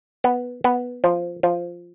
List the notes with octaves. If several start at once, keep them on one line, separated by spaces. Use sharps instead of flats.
B3
B3
F3
F3